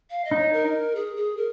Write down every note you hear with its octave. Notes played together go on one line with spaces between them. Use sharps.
F5
D#5
D#4
C#5
A#4
G#4
G#4
A#4